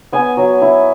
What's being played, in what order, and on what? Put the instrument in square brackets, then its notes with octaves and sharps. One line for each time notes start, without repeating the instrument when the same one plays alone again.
[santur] B3 G#5
F#3
E4